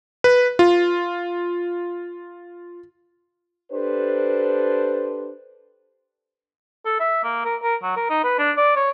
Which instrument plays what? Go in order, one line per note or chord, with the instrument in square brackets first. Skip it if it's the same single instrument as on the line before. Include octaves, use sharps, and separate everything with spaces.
[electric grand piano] B4
F4
[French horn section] D4 G4 A4 B4 C5
[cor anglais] A4
E5
A#3
A#4
A#4
F#3
A#4
D#4
B4
D4
D5
C#5